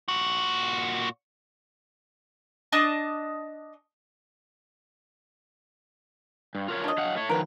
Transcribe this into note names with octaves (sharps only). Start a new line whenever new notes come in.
A#2 F#4
D4 D#5 A5 D#6
G2
F4 A#4 C#5
D4 D#5
F#3 F5 F#5
A3 C#5
D#3 F3 F#3 A#4 B4